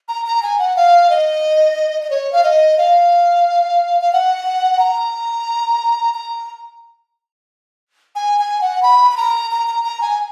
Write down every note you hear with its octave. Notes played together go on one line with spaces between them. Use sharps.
A#5
A#5
G#5
F#5
F5
D#5
D#5
C#5
F5
D#5
F5
F5
F#5
A#5
A#5
G#5
G#5
F#5
B5
B5
A#5
A#5
A#5
A#5
G#5